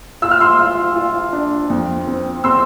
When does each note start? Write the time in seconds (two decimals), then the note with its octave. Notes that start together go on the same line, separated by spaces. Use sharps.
0.22 F4 E6
0.31 F6
0.40 C6 E6
0.59 F4
0.96 F4
1.33 D4
1.70 F2
2.07 C4
2.44 C4 C6 E6